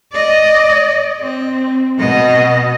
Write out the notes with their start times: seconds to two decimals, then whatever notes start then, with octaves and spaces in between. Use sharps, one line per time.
0.13 D5 D#5
1.21 C4
1.98 B2 D#5